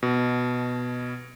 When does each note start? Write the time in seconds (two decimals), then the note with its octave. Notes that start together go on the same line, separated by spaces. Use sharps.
0.03 B2